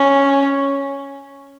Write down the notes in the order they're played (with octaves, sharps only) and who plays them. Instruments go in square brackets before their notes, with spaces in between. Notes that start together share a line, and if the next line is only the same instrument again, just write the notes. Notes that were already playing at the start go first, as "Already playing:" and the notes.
Already playing: [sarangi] C#4